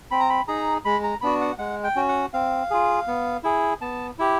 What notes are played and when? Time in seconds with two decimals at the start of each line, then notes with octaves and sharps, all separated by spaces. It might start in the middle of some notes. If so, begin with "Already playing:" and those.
0.11 C4 B5
0.20 A#5
0.30 B5
0.48 D#4 G#4 A#5
0.85 G#3 B5
1.04 A#5
1.21 B3 D4 F#4 B5
1.41 F#5
1.58 G#3 F#5
1.84 G5
1.96 C#4 F#4
2.09 F#5
2.34 C4 F5
2.70 F4 G#4
3.08 B3
3.44 E4 G#4
3.81 B3 A5
4.19 E4 G4